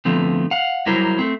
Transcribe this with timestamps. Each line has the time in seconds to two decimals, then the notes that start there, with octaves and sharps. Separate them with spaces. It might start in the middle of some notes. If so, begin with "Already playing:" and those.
0.05 D3 F3 A3 B3 C4
0.51 F5 F#5
0.86 F#3 G3 E4 A#4 C5
1.19 A3 C4